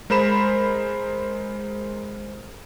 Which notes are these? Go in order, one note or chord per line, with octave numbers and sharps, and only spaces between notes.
G#3 A#4 C5 B5 E7